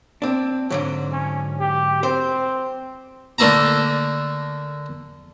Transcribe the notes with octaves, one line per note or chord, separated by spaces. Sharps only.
C4 D4
G#2 D3 F#3
C#4
G4
C4 C5
D3 A3 A#3 E4 A5 A#5